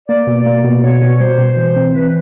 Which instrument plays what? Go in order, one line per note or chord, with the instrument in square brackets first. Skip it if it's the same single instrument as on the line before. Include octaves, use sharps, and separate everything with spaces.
[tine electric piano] A#3 [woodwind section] D5
[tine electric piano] B2
A#3
B2
[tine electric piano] B2 [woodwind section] C#5
[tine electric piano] B2
[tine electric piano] G3 [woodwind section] C5
[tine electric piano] B2
E3
C4
[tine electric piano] E3 [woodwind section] B4